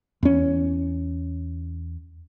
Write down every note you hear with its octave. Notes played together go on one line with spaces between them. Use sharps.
E2 C#4